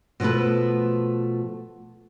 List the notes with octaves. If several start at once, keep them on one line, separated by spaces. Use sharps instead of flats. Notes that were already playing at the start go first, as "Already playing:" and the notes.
B2 F3 F#3 A3 B4